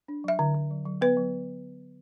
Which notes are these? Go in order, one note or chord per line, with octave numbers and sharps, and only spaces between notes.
D4
F#3 E5
D3
D3
F#3
F#3
B3 B4
F#3